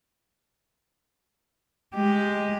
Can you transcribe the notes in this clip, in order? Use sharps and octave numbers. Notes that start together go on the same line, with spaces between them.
G#3 G4